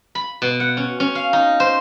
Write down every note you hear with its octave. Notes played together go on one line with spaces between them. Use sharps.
B5
B2
F#5
C#4
C#4
F5
D#4
C5